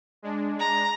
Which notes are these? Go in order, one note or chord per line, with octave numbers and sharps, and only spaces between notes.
G#3 D4
A#5